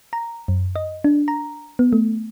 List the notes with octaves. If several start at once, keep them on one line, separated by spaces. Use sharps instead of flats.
A#5
F#2
D#5
D4
A#5
B3
A3